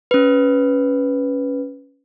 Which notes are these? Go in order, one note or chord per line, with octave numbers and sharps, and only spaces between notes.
C#4 B4